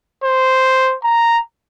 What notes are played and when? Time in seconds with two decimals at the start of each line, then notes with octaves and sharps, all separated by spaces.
0.24 C5
1.04 A#5